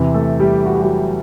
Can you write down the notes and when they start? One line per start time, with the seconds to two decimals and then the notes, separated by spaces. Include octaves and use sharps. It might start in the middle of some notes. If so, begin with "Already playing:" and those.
Already playing: E2 C3 E3
0.14 A3 A4
0.40 G3 G4
0.66 F#4
0.74 G4
0.82 F#3 F#4